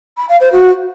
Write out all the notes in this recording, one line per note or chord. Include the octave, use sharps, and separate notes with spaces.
B5
F5
C5
F#4